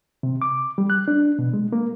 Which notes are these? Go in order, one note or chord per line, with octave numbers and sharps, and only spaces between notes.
C3
D6
G3
F#6
D4
B2
G#3
A#3